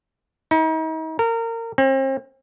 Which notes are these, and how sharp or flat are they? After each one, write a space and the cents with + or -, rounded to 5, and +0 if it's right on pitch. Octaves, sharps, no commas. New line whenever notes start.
D#4 +40
A#4 -25
C4 +40